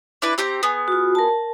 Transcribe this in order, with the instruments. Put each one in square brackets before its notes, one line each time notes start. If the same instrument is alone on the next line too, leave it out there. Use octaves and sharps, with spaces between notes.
[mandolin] D4 E4 B4
C4 G4 A#5
B3 G#4
[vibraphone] F4 F#4
A#4 A5